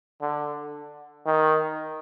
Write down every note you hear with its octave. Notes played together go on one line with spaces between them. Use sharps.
D3
D#3